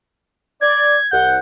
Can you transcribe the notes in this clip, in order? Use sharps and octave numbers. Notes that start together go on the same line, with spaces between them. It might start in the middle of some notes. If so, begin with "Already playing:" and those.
D5 G#6
C2 F#5 G6